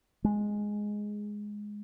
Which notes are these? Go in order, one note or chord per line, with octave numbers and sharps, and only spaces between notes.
G#3